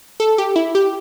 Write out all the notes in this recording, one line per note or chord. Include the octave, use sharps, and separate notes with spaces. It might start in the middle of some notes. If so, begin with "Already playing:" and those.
A4
G4
E4
G4